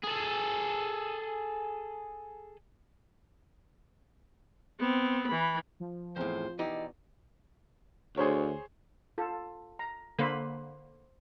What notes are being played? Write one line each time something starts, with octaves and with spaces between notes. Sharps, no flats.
G#4 A4
B3 C4
E3 B5
F3
E2 A2 C4 C5
B2 E3 D#4 G4 D5
D2 G#4 C5 C#5
F4 A4
A#5
D3 A#3 B4 C5 B5